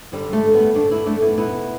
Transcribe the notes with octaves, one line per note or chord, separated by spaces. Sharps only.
G2 D3 G3
A3
G3 B3
G2 D3 A3 D4
B3 E4
A3 D4
B3 E4
E2 B2 B3 E4